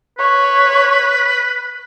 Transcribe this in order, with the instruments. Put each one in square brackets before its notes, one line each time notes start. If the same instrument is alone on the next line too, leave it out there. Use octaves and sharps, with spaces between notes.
[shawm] B4 [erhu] C#5